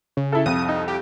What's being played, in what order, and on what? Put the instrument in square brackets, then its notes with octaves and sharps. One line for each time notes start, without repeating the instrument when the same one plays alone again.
[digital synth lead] C#3
[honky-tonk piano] E4 A4
[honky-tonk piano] C2 F2 [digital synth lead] D#6
[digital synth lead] D#4
G4